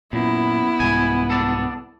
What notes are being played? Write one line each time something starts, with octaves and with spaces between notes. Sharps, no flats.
F#2 A#2 B3 E4
C2 G#2 G#5
A4 D5